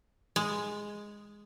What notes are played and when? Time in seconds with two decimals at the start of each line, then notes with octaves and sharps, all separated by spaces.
0.36 G#3